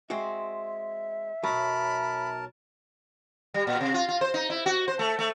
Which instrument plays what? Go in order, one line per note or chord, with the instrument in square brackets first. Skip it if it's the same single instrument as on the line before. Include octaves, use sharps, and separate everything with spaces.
[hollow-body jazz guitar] G#3 C4 F#4 [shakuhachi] E5
[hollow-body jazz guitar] B1 F#3 [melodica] A#4 A5 [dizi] B5
[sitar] G3
A#2
C3
F4
F4
C5
D#4
E4
F#4
C5
A3
A3